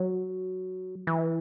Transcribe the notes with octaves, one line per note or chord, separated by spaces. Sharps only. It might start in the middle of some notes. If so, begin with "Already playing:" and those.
Already playing: F#3
E3